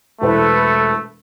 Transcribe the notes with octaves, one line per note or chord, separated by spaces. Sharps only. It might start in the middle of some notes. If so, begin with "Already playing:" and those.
E1 A3 E4 A4 B4 C5